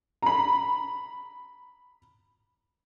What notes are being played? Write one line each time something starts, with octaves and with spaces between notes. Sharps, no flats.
A#5 B5